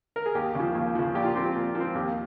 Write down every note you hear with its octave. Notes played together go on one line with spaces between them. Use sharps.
A#4
G#4
D#2 G4
C#3 F3
D#2
C#3 F3
A#2 G4
F4
F3 C4 G4
A#2
F3
C4
D#2 G4